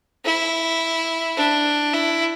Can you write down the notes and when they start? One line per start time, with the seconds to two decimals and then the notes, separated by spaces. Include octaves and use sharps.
0.25 E4
1.37 D4
1.94 E4